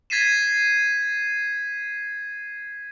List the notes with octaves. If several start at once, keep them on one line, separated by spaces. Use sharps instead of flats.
G#6 A6 B6 C7 D#7 E7